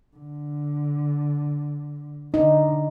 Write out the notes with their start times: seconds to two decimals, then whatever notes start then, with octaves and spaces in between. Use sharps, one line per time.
0.17 D3
2.34 D3 D#4